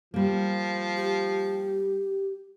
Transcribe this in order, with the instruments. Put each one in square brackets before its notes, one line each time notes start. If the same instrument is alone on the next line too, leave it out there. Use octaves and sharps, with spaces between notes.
[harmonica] F3 [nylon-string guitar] G3 A#3
[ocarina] G4